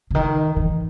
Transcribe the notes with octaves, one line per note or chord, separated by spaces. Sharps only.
C#3
D#3
E3